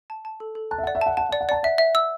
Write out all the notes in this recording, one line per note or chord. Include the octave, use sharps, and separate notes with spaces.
A5
A5
A4
A4
A5 F#6
E5
D5 F#5
E5
F#5 A5
F#5 A5
F#5
D5
F#5
D5 A5
E5 F#5
E5
E6